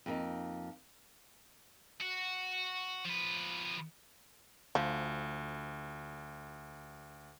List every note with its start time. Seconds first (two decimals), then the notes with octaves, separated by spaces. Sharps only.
0.06 F2 A#3 D#4
2.01 F#4
3.05 F3 B4
4.75 D2 F3